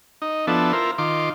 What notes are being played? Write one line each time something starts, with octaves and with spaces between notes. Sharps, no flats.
D#4
F3 B3 D4 E4 A4
E4 F4 A#4 C5
D#3 F4 C6 D6